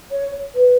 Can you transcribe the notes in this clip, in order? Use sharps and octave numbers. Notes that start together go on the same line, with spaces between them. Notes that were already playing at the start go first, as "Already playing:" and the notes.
C#5
B4